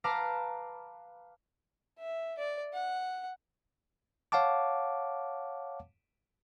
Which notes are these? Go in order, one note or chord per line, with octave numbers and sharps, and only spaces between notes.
B4 F5 A5 A#5 D6 F6
E5
D5
F#5
C#5 F5 F#5 A5 D6